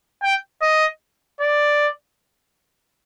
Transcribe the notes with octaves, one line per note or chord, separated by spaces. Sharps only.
G5
D#5
D5